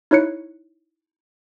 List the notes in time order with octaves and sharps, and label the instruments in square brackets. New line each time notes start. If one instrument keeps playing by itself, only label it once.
[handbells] D#4 E4 C#5 F#6 C#7